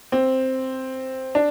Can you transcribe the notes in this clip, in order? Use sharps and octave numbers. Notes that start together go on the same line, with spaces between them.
C4
D4